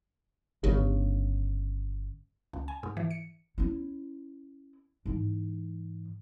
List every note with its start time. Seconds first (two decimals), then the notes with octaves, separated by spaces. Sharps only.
0.64 G1 C#3
2.53 C#2
2.68 G#5
2.83 G#2
2.97 E3
3.11 C#7
3.58 C#4 E4
5.06 G#2 E3